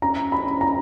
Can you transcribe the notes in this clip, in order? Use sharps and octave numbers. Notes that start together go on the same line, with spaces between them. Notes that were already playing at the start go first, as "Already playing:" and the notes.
C#4 A#5
B5
C#4
A#5